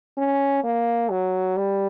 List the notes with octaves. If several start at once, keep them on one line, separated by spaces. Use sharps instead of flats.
C#4
A#3
F#3
G3